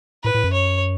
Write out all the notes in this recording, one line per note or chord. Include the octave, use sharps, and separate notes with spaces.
A2 B4
A2
F#2
C#5